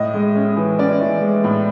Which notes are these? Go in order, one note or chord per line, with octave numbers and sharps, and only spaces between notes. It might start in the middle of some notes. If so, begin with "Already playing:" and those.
Already playing: A2 D#5
G#3
C#4
E3
C#4 D5
E3
G#3
A2